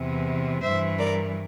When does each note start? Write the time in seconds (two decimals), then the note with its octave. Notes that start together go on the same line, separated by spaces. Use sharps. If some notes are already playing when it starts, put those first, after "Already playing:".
Already playing: E2 C3 E3
0.62 G2 E3 C5 E5
0.99 A#4 D5